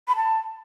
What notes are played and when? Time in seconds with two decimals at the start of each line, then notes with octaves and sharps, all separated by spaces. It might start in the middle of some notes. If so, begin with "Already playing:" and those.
0.08 B5
0.16 A5